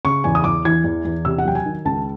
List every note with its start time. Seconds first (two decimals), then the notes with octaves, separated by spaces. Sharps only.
0.05 C#3 C#6
0.24 E2 G#5
0.35 D#6
0.44 E2 D6
0.65 E3 G#6
0.84 E2
1.05 E2
1.25 C3 E6
1.38 F#5
1.45 F#3 G5
1.55 G#5
1.66 D#3
1.85 C#2 A5